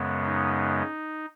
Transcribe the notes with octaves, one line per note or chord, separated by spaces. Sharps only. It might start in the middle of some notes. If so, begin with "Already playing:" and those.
Already playing: F#2 C#3 G#3 B3
D#4